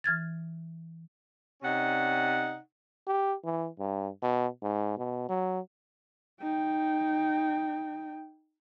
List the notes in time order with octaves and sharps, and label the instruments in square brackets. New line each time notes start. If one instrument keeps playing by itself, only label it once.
[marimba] E3 F6 G#6 A6
[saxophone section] C3 C#4 D#4 D5 F#5
[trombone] G4
E3
G2
B2
G#2
B2
F#3
[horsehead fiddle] D#4 G5